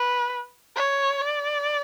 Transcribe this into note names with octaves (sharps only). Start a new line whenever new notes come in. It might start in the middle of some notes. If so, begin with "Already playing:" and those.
Already playing: B4
C#5
D5